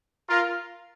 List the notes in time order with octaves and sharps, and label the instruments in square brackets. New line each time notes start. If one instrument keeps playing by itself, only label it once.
[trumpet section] F4 A#4